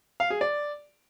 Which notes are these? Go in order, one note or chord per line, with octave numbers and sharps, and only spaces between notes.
F5
G#4
D5